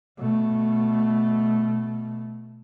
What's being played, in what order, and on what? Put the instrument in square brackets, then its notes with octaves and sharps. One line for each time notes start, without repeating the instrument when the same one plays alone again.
[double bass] B2 A3